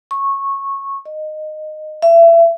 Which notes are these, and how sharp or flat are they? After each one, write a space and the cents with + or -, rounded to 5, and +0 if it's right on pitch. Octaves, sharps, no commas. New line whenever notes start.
C#6 -15
D#5 -15
E5 +30